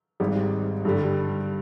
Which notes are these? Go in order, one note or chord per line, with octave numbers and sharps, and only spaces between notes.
G#1 G#2 G3
G2 D3 G3